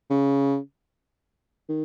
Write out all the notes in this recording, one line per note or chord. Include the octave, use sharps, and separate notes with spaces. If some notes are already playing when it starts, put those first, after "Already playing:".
C#3
D#3